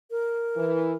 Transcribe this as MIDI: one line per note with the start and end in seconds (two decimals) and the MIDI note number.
0.11 0.96 70
0.57 0.94 52